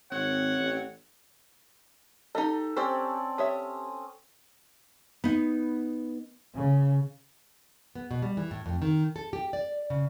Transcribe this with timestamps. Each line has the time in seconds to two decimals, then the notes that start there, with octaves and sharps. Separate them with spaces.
0.12 G#1 C4 C#5 F#5
0.58 A1
2.35 D#4 G4 A4 D#5
2.76 C4 C#4 G4 C5 D5
3.38 G4 C#5 E5 D#6
5.24 B3 D#4
6.55 C#3
7.95 B3
8.11 B2
8.22 G3
8.37 E3
8.51 A2
8.66 F2
8.82 D#3
9.16 A4
9.33 G4
9.53 D5
9.90 C#3